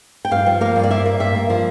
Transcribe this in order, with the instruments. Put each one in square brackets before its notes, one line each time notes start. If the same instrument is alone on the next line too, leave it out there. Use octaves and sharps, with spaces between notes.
[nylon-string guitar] G5
G2 F5
F3
A#3 F5
G2
D5
A#3 E5
A#3
G2 E5
A#3
F3